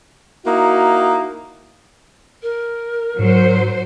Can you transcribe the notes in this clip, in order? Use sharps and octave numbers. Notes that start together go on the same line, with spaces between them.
A#3 D#4 E4 F#4
A#4
G#2 F#3 C5